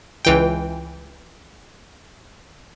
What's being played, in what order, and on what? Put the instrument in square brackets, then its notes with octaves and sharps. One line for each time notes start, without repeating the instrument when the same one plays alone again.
[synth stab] C#2 E3 G5